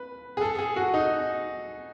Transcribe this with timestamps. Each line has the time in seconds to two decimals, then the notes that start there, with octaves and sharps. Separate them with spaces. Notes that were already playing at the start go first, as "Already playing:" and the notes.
Already playing: B4
0.37 G#4
0.41 A4
0.59 G#4
0.76 F#4
0.94 D#4